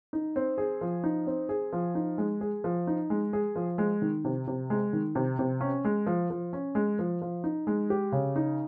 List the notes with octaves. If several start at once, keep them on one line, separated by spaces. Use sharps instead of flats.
D#4
C4
G#4
F3
D#4
C4
G#4
F3
D#4
G#3
G#4
F3
D#4
G#3
G#4
F3
G#3
D#3
C3
C3
G#3
D#3
C3
C3
C#4
G#3
F3
F3
C#4
G#3
F3
F3
D#4
G#3
G4
C#3
D#4